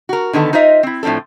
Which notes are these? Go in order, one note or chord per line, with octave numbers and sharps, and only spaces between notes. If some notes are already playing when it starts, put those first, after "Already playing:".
F#4 A#4
D3 D#3 B3 A4
D#4 F4 C5 D#5 E5
C4 E4
A2 F3 C4 D4 A4